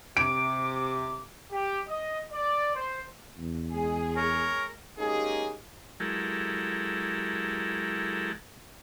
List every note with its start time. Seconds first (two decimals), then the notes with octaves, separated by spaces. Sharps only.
0.17 C3 D6 D7
1.51 G4
1.88 D#5
2.32 D5
2.74 C5
3.38 E2
3.71 G#3 G#4
4.17 A#4 C#5
4.99 G#3 A#3 C#4 D#4 G4 G#4
6.00 F#3 G#3 E4 G4 A4 A#4